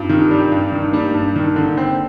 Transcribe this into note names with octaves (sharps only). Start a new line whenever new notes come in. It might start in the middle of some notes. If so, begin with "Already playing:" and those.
Already playing: G2 C4 D4 D#4 F4 G4
D#3
G3
G2
D#3
G3 A#3 D4
G2
D#3
D3
C4